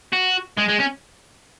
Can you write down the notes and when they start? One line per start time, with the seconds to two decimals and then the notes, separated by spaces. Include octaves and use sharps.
0.13 F#4
0.57 G#3
0.68 G#3
0.79 C#4